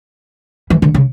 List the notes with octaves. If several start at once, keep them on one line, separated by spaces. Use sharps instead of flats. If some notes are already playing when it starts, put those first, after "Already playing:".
E3
D3
C#3